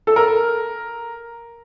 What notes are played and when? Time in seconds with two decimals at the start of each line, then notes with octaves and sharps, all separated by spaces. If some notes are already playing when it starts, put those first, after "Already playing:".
0.07 A4
0.16 A#4